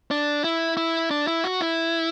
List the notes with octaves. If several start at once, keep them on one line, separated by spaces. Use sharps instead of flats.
D4
E4
E4
D4
E4
F#4
E4